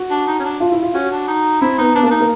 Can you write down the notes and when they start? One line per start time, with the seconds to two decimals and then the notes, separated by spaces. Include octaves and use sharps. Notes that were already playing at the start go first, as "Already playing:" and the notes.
Already playing: F#4
0.11 D4
0.27 D#4
0.39 C#4
0.44 D4
0.60 F4
0.72 E4
0.83 F4
0.94 C#4 F#4
1.11 D4
1.28 D#4
1.61 C4 E4
1.78 B3 D#4
1.95 B3 D4
2.03 A#3
2.06 D4
2.11 D#4
2.20 A#3